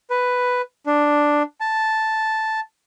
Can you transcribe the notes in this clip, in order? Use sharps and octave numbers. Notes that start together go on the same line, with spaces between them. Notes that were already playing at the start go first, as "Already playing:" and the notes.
B4
D4
A5